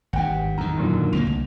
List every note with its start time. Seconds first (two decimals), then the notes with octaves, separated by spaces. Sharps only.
0.13 G#1 G2 F#5 G5
0.58 E2 D#3 A#5
0.77 F#2 A#2 D3
1.13 D2 A#2 A#3 F7
1.27 C2